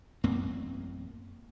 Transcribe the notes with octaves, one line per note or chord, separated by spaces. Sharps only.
A1 F#2 A#3 C4